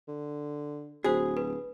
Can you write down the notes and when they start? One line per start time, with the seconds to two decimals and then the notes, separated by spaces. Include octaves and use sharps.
0.08 D3
1.04 D1 F#4 G#4 C5
1.37 B4